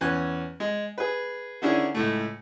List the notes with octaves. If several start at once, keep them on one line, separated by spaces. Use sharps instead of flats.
E2 C#4 B4 G#5 F#6
G#3
G#4 B4
D3 D#3 C#4 D4 E4 G#4
C#2 A2 A3